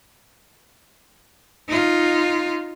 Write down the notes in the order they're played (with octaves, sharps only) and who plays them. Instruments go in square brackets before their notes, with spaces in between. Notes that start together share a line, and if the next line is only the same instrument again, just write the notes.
[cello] D#4 F4